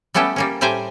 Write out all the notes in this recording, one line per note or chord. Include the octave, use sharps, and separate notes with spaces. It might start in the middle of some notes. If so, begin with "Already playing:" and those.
G3 A3 B3 C#4 G4 A4
G3 A#3 C#4
A2 G3 G4 C5 G#5 A#5